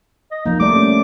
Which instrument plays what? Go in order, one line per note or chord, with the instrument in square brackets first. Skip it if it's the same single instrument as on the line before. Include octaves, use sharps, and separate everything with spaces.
[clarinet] D#5
[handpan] F3 A#3 [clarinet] D#4
[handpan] G3 A3 D5 [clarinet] D6
[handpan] C#4